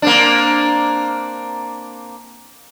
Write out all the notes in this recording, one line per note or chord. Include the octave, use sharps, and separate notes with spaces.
A#3 C4 D4